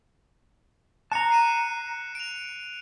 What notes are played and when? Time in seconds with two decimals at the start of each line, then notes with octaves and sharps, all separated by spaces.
1.12 A5 A#5 F#6 C#7
1.30 C7 D#7 E7
2.15 D7 F7